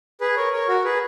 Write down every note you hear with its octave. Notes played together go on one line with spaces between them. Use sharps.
G#4 B4
A#4 C#5
A#4 C#5
F#4 A#4
G#4 B4